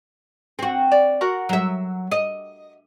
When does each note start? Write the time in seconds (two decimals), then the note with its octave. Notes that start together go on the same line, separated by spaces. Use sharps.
0.59 C4 F#4
0.92 D5
1.21 F#4 A#4 F#5
1.49 F#3 E5
2.11 D#5